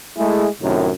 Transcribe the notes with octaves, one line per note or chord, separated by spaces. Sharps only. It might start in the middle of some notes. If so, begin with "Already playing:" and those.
G#3 A3 E4 G#4
F#2 A2 C3 D#3